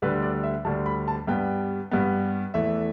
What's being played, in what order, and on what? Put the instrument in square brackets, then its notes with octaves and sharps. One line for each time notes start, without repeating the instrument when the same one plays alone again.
[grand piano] D2 D3 G3 B4
D5
E5
D2 D3 G3 A5
B5
A5
G2 G3 B3 G5
G2 G3 B3
E2 E3 A3 E5